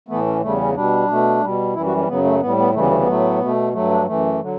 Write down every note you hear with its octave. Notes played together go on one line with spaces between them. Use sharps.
A2 E3 A3 B3
C#4
E2 C#3 G3 A3
C#4
B2 G3 D4
B2 A3
B2 G3
F#2 E3 G3 E4
F#4
C#4
F#2 C#3 F#3 B3
A3
A2 G3 B3
B3
D2 C#3 E3 G3 A3
B3
A3
B3
A2 F#3 A3
B2 A3
G2 F#3 A3
D4
F#2 E3 A3
D3 F#3